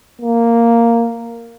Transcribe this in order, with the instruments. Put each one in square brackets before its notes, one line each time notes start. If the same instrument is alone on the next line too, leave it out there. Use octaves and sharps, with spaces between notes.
[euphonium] A#3